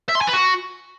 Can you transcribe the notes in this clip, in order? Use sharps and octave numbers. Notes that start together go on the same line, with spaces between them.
E5
C6
G#5
B4
F#4